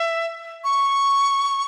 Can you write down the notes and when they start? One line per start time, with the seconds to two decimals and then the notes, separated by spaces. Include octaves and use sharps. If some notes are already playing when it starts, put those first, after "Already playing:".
Already playing: E5
0.64 C#6